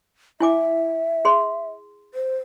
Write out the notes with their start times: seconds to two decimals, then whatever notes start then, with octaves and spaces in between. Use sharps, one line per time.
0.40 E4 E5 G#5 D6
1.25 G#4 C6
2.14 C5